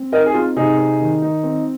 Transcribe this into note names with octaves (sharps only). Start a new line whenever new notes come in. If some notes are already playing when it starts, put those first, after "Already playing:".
Already playing: C4
D#4 A#4 D#5
G#4
C4 F4
C3 D#4 G#4
D#4
D#3
D#4
C4